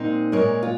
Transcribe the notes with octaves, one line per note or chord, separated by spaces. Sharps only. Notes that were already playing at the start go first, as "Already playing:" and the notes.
Already playing: A#2 G#3 C4 D#4
A#2 G#3 A#4 C#5
F4